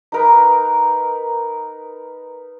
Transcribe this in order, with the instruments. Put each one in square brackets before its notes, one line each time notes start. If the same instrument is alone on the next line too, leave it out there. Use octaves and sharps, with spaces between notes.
[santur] D#4 A#4 B4